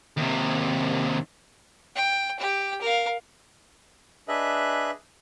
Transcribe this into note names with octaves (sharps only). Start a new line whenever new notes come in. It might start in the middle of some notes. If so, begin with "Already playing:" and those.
D#2 C3
G5
G4 G5
A#4 F5
D4 G#4 B4 D#5 E5 F#6